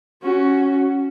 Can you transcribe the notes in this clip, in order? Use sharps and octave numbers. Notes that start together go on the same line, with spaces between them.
C#4 F#4